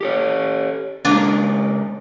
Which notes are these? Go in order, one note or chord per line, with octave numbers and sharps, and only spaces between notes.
G4 A4 C#5
C#3 G#3 A#3 D4 F4 A#4